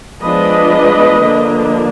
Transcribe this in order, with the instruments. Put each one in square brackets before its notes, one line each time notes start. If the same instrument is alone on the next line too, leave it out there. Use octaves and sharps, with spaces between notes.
[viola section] F3 G#3 B3 D4 B4 D#5
D3 F3 A#3 D4